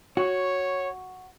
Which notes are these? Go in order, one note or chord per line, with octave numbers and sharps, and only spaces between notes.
F#4 C#5